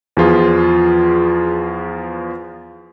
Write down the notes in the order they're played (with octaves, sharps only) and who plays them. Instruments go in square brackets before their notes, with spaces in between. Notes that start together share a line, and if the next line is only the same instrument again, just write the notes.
[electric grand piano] E2 F3 F4 G#4